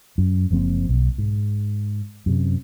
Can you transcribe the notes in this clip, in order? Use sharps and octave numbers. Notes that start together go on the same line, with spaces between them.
F#2
F#1 F3 A#3 C4
B1
G#2
F#2 C3